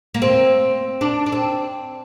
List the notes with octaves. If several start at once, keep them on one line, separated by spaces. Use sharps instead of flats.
A#3
C4
D4
D4
C4